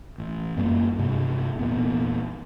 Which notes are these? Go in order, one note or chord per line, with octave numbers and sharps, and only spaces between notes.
A1
F#2 G3 G#3 A#3
G2 C3 G#3
E2 A#2 B3